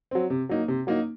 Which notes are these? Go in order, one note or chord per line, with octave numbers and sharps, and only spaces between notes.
F#3 C4
C3
F#3 A#3 D#4
C3
F#3 A#3 D#4